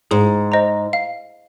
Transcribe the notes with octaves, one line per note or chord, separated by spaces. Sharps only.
G#2 G#4
C5 D#5 A#5
F5